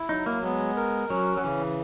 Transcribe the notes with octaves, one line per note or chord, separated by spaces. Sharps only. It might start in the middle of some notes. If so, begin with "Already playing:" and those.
Already playing: E4
F#3 D#4
A#3
G#3 B3
A#4
F#3 C#4
F#3
C#3 E3